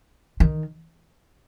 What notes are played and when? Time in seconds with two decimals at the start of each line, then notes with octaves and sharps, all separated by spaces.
0.40 D#3